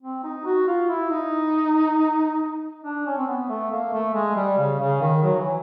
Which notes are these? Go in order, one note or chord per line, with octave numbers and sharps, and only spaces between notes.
C4
D#4
F#4
F4
E4
D#4
D4
C#4
C4
B3
A3
A#3
A3
G#3
G3
C#3
C#3
D#3
F#3
E3